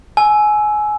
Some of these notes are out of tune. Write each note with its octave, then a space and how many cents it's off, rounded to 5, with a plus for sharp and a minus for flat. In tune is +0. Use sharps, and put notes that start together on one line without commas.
G#5 +20 E6 +0